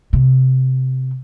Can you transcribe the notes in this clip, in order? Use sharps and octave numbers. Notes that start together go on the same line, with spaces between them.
C3